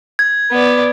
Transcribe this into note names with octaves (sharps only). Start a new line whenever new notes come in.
G#6
B3 D5